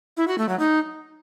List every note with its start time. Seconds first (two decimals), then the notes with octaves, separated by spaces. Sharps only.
0.17 E4
0.28 F#4
0.38 A3
0.49 F#3
0.59 D#4